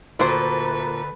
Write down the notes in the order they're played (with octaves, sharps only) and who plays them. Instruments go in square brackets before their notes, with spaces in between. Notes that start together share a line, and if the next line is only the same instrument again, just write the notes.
[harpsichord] D2 [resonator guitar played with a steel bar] A#2 [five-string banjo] F#4 C5 [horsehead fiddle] A4 B4